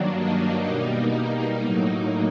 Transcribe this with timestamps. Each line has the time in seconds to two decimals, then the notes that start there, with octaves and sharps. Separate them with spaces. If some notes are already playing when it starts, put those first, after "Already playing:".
Already playing: G2 D#3 F#3 A#3 D4
0.17 D#4
0.65 B2 G3 A#3
1.14 D#4
1.62 A2 F#3 A#3